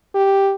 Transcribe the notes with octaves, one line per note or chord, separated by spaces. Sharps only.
G4